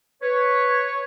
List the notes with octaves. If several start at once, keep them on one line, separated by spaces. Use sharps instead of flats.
B4 C#5